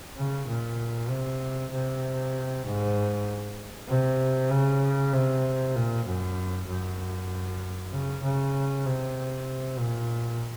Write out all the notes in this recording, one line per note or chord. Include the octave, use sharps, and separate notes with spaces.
C#3
A#2
C3
C3
G#2
C3
C#3
C3
A#2
F#2
F#2
C#3
C#3
C3
A#2